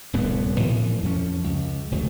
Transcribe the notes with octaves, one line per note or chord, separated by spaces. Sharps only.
D1 C2 F#2 B3
A2 E3 F3
F2 F3 C#4
C#2
F1 D2